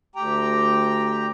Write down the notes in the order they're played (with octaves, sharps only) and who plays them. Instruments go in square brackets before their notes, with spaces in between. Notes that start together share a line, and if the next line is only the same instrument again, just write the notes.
[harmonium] D2 G4 G5 A#5